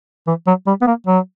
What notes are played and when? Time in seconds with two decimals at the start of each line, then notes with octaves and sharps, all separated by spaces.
0.27 E3
0.47 F#3
0.67 G3
0.82 B3
0.87 A#3
1.07 F#3